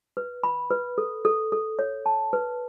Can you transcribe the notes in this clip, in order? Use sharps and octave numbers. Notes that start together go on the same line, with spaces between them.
B4
B5
B4
A4
A4
A4
C#5
A5
B4